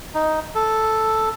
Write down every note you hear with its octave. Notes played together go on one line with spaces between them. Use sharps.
D#4
A4